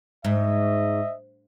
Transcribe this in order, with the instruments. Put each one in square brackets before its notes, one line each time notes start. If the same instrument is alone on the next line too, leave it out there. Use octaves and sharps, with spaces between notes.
[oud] G#2 [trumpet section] D#5 E5